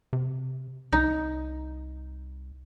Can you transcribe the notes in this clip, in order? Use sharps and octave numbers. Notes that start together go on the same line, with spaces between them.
C3
C2 D#4